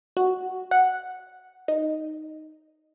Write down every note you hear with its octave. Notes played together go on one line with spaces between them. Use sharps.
F#4
F#5
D#4